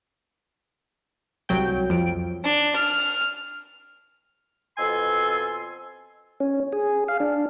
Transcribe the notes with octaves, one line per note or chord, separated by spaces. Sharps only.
C2 F#3 G5
F2 D7
D4
F6
F2 B2 A4 G#5 C6 E6
C#4
G#4
F5
D4